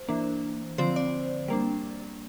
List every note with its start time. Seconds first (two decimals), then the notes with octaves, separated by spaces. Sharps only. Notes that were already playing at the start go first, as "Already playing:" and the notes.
Already playing: C5
0.08 E3 A#3 D4
0.78 D3 F3 C4 C5
0.96 D5
1.48 G3 A#3 D4